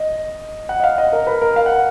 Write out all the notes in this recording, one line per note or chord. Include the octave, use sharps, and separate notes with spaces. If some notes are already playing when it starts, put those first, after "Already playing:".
Already playing: D#5
F#5
D#5
F5
D#5
A#4
B4
A#4
F5
F#5